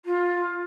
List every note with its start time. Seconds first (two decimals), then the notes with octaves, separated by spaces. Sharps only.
0.05 F4